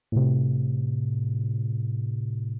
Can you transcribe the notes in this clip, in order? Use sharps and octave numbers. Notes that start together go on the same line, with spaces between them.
A2 C3